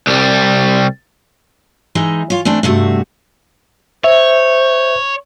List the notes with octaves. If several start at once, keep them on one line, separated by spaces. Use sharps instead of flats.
C2 G3
E3 G#3 D#4
F4 C#5
E3 A3 C4 D4
G2 C3 A3 F#4
C5 C#5 E5